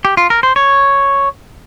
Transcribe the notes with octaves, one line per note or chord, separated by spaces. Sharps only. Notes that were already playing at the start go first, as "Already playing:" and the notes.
G4
F4
A#4
C5
C#5